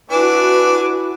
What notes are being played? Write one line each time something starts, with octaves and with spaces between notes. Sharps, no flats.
D4 E4 F#4 B4 G#5 D6